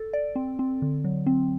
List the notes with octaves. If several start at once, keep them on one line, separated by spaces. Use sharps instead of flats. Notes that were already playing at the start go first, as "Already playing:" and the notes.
Already playing: A4
D5
C4
C4
D3
F#3
C4